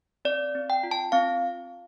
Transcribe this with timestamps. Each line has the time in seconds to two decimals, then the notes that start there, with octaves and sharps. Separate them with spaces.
0.25 C4 D5
0.55 C4
0.70 G5
0.83 F4
0.91 A5
1.12 C4 F5